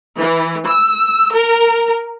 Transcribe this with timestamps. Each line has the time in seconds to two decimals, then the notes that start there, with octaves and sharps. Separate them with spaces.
0.18 E3
0.67 E6
1.34 A#4